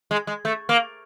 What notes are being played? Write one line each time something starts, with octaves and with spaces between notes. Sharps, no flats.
G#3
G#3
A3
A#3